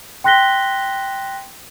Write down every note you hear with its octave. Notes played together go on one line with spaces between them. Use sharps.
G5 C6 F#6 A#6 B6 G7